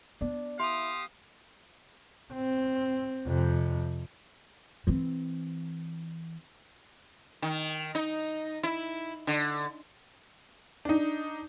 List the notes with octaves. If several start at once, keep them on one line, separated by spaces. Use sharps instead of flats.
B3 D4
E4 G4 F5 C6 D#6 F7
C4
F2 C3
E3 C4
D#3
D#4
E4
D3
D4 D#4